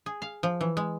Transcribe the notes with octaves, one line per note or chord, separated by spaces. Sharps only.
G#4
F5
F3
E3
G#3